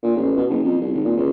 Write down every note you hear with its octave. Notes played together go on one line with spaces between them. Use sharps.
A#2
A1
B2
F#1
F2
C2
G#1
A#2
C#2